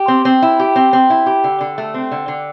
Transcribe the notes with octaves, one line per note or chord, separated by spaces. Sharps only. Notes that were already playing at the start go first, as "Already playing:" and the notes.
Already playing: G4
C4
C4
E4
G4
C4
C4
E4
G4
D3
D3
A3
C4
D3
D3